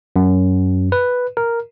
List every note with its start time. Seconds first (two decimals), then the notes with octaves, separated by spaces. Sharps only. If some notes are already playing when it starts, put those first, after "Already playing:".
0.16 F#2
0.92 B4
1.37 A#4